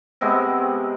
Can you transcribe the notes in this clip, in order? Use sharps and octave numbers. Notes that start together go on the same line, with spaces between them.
C3 G#3 B3 C4